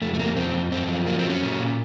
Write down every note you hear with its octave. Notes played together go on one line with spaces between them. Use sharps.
F2 A3
A3
C3 A#3
F2 C4
F2
F#2 C4
F3
F#3 A#3
C4
F#3 C#4
A#2
A#2